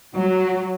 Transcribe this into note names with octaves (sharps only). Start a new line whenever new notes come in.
F#3